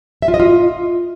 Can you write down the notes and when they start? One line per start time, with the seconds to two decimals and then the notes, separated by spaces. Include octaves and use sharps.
0.22 E5
0.28 F4
0.34 D#5
0.40 F4